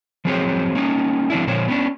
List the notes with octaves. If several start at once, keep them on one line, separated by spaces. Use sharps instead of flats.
F3 F#3 C4 G#4 C5 C#5
A#3 C#4 D#4
F3 C4 D4 E4
A#2 D3 F3 C5 C#5
B3 C#4 D4